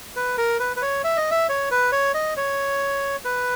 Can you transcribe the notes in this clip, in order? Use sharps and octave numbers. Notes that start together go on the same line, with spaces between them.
B4
A#4
B4
B4
C#5
E5
D#5
E5
C#5
B4
C#5
D#5
C#5
B4